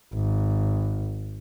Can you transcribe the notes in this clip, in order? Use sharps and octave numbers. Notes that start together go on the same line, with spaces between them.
G#1